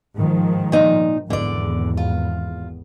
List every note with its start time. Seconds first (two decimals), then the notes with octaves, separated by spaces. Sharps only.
0.16 G#2 D#3 F3
0.72 A#2 D#4
1.30 G#1 E2 D3 D5
1.97 F4